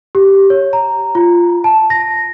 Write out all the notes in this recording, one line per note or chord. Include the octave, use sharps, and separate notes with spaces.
G4
C#5
A#5
F4
A5
A#6